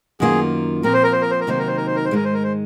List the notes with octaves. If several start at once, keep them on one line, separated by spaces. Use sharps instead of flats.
F#2 D#3 A#3 F4 G#4
A#2 F3 C4 A#4
C5
A#4
C5
A#4
C5
A#4
C3 D#3 F#3 A#3 D#4 C5
A#4
C5
A#4
C5
A#4
C5
G#2 D#3 G#3 A#4
C5
A#4
C5